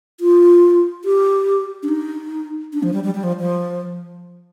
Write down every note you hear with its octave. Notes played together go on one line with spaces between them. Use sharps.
F4
G4
D4
D#4
D4
F3
G3
G3
G3
F3
F3